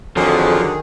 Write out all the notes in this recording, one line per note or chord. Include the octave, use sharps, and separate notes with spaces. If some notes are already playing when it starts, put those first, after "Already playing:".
F2 D3 D#3 F3 F#3 G#4